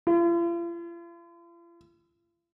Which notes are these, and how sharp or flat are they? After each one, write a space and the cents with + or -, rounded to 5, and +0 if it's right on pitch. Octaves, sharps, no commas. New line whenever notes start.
F4 -45